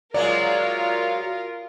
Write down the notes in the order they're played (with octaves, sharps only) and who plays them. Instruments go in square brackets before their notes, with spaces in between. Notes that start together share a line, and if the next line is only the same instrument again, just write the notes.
[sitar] F#3 G#3 [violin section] F4 A#4 [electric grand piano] D5